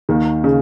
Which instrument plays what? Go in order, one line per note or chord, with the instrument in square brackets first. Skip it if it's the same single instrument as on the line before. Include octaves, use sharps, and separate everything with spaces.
[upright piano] D#2 D#3
C#3